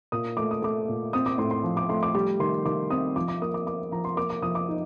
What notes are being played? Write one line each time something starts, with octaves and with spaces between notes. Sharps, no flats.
A#2 D#6
A3 D6
D#6
A3 D6
A#2
C4 D#6
D6
A2 C6
C6
F3
D6
A3 C6
D6
G3 D6
D#3 C6
D#3 D6
C4 D#6
F3 D6
D6
A#3 D#6
D6
A#3 D6
F3 A#5
C6
A#3 D6
D6
F3 D#6
D6
D#4